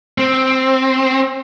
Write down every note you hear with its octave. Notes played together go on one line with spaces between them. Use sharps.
C4